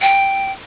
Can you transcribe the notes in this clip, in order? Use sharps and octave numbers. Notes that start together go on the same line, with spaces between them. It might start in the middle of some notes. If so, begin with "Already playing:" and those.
G5